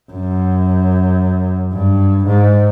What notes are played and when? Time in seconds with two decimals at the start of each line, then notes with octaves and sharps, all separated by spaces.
0.11 F#2
1.72 G2
2.26 G#2